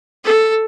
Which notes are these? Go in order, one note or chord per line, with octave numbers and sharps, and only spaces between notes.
A4